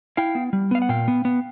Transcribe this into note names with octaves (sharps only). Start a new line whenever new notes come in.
E4 F5 G5
B3
G3
B3 F5
F#5
A#2 F5 G5
B3
B3